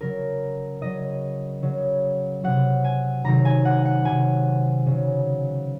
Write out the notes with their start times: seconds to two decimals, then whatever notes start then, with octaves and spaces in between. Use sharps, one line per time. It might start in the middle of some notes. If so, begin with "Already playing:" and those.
0.01 C#3 F#3 A#4
0.82 C#3 F#3 D#5
1.63 C#3 F#3
2.43 C3 F#3 F#5
2.84 G#5
3.25 C3 D#3 F#3 A#5
3.45 G#5
3.65 F#5
3.85 F#5
4.05 C3 F#3 G#5
4.86 C#3 F#3